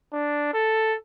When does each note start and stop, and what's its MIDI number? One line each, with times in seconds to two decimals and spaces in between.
0.13 0.51 62
0.54 0.95 69